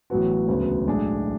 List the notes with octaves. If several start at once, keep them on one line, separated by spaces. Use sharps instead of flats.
A1 A2 F#3 B3 F#4
E1 D2 C#3 F#3 B3
B1 A2 G#3 D4 G#4